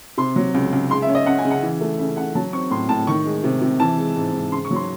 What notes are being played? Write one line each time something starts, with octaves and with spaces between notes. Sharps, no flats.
C3 C6
F#3
C#2
C#2
G#3 C6
E5
C#4
D#5
C#3 F#5
G#5
C#3
F#5
E3
A3
C#3 E5
C#3 F#5
F#3 A5
C4 C#6
A2 C6
A2 A5
D#3 C#6
G#3
C3
C3
E3 A5
G#3
G#2
G#2
C#3 C6
C#6
F#3
C6